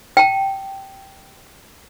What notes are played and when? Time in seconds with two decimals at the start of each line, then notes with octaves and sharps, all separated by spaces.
0.17 G5 A5